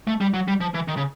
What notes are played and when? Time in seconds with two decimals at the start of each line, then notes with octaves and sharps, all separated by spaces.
0.07 A3
0.21 G3
0.34 F#3
0.48 G3
0.61 F3
0.74 E3
0.88 D#3
0.97 C#3